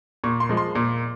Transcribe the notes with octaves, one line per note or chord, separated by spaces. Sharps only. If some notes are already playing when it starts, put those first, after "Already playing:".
A#2 C#6
C6
F3 G#3
C6
A#2